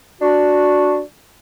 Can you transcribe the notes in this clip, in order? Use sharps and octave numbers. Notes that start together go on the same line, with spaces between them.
D4 F#4